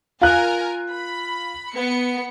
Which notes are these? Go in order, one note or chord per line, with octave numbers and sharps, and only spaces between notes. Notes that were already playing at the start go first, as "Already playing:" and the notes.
F4 A#4 G#5 F#6
B5
B3 C#7